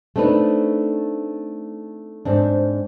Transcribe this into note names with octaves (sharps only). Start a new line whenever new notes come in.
A3 C4 D4 D#4 B4
G#2 C4 D4